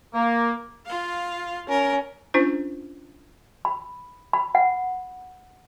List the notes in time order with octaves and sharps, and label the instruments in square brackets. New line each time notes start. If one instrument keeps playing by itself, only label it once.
[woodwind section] A#3
[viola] F4 F5
[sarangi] C#4 [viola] A#4
[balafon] C#4 D4 F4 C5
[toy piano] B5
B5
F#5